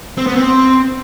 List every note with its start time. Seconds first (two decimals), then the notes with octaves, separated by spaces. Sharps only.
0.18 C4
0.27 B3
0.36 C4